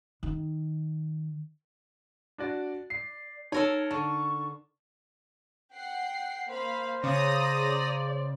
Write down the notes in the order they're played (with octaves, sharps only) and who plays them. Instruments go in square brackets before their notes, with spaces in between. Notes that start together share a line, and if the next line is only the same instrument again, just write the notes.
[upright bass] D#3
[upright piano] D4 F#4 D5
[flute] D5 [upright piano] C7
[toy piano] D#4 [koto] A4 A#4 G#5 [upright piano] C#5 [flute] A5
[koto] D3 [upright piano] A5 [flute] C#6
[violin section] F#5 G5 C7
[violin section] A#3 F5 B5 [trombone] C5
[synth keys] C#3 [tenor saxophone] D5 [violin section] A#5 D#6 A#6